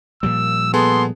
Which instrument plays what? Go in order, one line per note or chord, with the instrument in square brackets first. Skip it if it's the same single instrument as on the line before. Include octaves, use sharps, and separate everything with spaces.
[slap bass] A#2 F3 G3 [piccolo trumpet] E6
[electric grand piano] B3 G#4 A4 [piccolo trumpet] C6